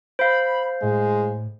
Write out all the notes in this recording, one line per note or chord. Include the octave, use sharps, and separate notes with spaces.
C5 F5 B5
A2 G#3